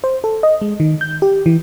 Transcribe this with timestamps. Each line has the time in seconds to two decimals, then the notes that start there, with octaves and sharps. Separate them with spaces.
0.04 C5
0.24 A4
0.43 D#5
0.62 G#3
0.80 D#3
1.01 G6
1.22 G4
1.46 E3